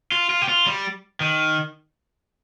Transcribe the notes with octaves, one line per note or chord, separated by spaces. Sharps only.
F4
F4
G4
F4
G3
D#3